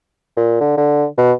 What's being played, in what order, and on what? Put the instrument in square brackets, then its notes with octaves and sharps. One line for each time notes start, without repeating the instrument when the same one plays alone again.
[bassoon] A#2
D3
D3
B2